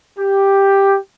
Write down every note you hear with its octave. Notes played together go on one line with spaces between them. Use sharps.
G4